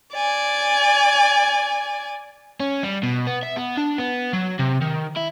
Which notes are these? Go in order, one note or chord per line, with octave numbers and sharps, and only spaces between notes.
D5 G#5
C#4
G3
B2
B3
E5
B3
D4
B3
F#3
C3
D#3
E4